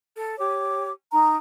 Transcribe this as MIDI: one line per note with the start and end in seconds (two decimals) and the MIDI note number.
0.15 0.36 69
0.38 0.90 67
0.38 0.90 73
0.38 0.90 86
1.11 1.37 63
1.11 1.37 82